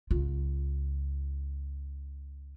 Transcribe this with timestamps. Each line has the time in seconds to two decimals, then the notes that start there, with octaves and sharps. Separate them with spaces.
0.11 C#2 F4